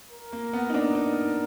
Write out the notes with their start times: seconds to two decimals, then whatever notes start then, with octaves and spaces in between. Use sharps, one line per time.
0.11 A#4
0.33 A#3
0.53 B3
0.70 D#4
0.74 D4
0.95 D#4